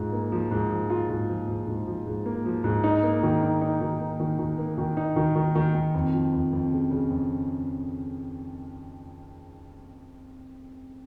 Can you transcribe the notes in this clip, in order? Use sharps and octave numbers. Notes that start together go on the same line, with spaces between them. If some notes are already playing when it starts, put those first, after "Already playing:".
Already playing: G#2 F4
A#3
F3
G#2
F3
F4
G#2
F3
G#2
G#2
F3
G#2
A#3
F3
G#2
D#4
A#3
D#3
D#4
D#4
D#3
A#3
D#3
D#3
A#3
D#3
D#4
D#3
D#3
D#3
D#3
F2
F3
F2
F2
C#3
C#3
F2